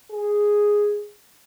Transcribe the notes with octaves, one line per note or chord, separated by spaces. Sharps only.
G#4